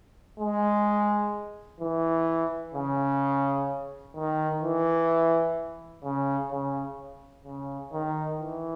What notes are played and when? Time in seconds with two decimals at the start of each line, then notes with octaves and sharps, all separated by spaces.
0.40 G#3
1.80 E3
2.74 C#3
4.16 D#3
4.63 E3
6.04 C#3
6.51 C#3
7.45 C#3
7.93 D#3
8.40 E3